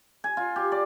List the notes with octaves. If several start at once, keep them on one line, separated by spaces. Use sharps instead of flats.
G#5
F4
G4
D5